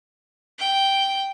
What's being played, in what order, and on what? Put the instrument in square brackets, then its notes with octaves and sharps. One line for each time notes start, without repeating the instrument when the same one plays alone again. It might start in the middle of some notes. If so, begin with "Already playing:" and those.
[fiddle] G5